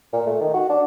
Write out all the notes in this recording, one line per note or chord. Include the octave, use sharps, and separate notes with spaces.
A#2
A3
D#3
F#4
D4